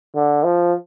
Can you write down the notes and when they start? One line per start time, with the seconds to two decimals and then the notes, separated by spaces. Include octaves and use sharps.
0.15 D3
0.44 F3